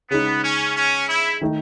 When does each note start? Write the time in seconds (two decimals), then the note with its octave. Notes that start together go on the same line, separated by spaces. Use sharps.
0.10 C#3 G#3 B3 D#4
0.44 C#4
0.76 C#4
1.08 E4
1.41 D#3 A3 D#4